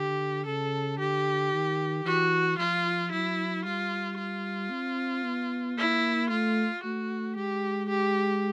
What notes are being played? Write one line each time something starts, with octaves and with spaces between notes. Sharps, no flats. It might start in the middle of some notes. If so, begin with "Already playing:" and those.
Already playing: D3 G4
C#3 A4
D3 G4
D#3
E3 F#4
F3 F4
F#3 E4
G3 F4
F4
C4
B3
A#3 E4
A3 F4
A3 F#4
G#3 G4
G4